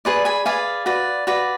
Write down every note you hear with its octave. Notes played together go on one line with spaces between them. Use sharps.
G#4 B4 D5
G#5 B5
G#4 B4 D5 F5 G#5
F#4 B4 D5
F#4 B4 D5